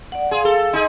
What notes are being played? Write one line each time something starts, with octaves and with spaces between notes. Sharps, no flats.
D5 F#5
G#4 F5 C6
A4 F5
D#4 G#4 C6